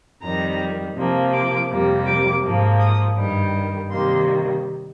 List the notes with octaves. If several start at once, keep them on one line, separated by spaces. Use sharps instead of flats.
F2 D#3 G3 A#5
C3 F3 A#3
D6
F2 C3 G3 A#3
D6
G#2 F3 A#3
D#6
G2 D#3 G3
C3 D#3 G3 A#3 C6